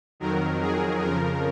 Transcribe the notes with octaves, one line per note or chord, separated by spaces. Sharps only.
F2 D#3 F#3 A#4
G#4
F2 C#3 F3 A#4